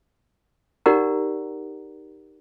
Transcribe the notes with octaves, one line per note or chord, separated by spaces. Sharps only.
D#4 G4 A#4 D5 F#5 A#5